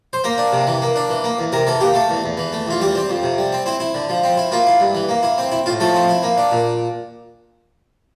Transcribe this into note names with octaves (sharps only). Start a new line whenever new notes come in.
C5
A#3 A#4
D4
C3
E3
A#3
D4
E3
A#3
E2
C3 A#4
E3 A4
A#3 G4
A3 A4
E2
E2
E3
A3
E2 F4
G3 G4
C4
F2
C3
G3
C4
C4 E4
E4
D3
F3
C4
E4
A#3 F4
E4
G2
E3
A#3
E4
C4
E4
A2 F4
F3 A3 A4
C4
E4
A#3
D4
A#2